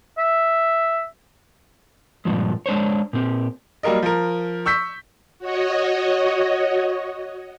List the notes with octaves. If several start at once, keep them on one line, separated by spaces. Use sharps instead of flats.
E5
G2 A#2 C#3 F3 G#3
G#3 D4 C5 C#5
A#2 C4
F#3 G3 A#3 A#4 D#5
F3 A#4
C#6 E6 G6 B6
F#4 C#5 D#5